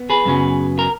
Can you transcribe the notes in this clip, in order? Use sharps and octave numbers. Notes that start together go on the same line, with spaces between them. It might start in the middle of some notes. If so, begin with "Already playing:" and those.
Already playing: B3
G#4 B4
F#2 C#3 F#3 B3
A#4